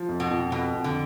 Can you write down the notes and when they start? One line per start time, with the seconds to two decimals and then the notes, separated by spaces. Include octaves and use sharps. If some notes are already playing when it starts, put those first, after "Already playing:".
Already playing: F3
0.09 F2
0.20 B2
0.31 F2
0.52 F2 B2
0.74 F2
0.84 D3